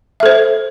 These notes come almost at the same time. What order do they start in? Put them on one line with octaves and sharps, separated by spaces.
E5 A4 C5